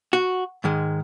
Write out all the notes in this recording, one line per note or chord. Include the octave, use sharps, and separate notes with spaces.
F#4
G#2 D#3 G#3